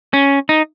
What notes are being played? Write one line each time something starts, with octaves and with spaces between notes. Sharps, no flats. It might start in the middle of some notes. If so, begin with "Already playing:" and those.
C#4
D#4